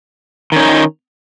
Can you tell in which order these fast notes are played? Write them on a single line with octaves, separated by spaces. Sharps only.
D#3 C#4 D#4